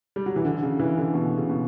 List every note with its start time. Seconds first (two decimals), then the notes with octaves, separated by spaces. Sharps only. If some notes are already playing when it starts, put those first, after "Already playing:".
0.16 G3
0.26 F#3
0.36 E3
0.45 D3
0.63 C#3
0.79 E3
0.98 D3
1.14 B2
1.37 C#3
1.50 B2